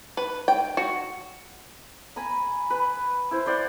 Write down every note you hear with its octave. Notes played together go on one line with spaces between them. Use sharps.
B4
G5
F#4
G#5 A#5 B5
B4
E4 C5
C5 D5 F#5